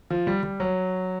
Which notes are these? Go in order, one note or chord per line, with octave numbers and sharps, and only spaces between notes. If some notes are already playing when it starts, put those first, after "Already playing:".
F3
G3
G3
F#3